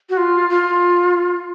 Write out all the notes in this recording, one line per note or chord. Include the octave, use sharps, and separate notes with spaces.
F#4
F4
F4